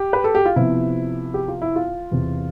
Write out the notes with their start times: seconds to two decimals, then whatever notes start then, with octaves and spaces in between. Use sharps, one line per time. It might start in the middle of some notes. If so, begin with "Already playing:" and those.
Already playing: G4
0.13 B4
0.24 A4
0.35 G4
0.45 F4
0.56 C3 F3 B3 E4
1.34 G4
1.48 F4
1.62 E4
1.76 F4
2.12 E2 C3 E3